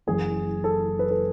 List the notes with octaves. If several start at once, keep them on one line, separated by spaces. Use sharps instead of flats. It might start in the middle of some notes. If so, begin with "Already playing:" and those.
F#1 F#2 E3 G#4
A4
B4
A4